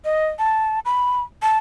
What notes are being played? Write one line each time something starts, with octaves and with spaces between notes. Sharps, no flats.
D#5
A5
B5
A5